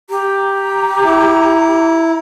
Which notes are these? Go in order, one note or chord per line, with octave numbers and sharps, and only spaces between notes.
G4 A#5
E4